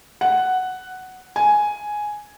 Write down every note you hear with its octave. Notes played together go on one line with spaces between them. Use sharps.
F#5
G#5